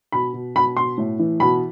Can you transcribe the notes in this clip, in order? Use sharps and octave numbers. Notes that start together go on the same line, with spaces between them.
B2 B5
B2
B2 B5
B2 C6
A2
E3
B2 B5